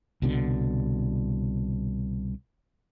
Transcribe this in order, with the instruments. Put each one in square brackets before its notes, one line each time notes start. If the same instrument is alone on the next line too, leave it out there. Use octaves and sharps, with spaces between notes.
[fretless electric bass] C2 B2 D3